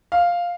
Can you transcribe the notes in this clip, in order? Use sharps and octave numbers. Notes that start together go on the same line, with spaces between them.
F5